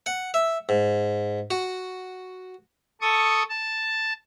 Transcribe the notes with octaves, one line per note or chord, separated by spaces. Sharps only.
F#5
E5
G#2
F#4
A4 C#6 D#6
A5